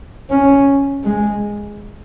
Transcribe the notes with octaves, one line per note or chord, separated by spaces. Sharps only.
C#4
G#3